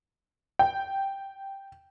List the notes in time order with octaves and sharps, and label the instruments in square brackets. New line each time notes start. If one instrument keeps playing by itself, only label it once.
[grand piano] G5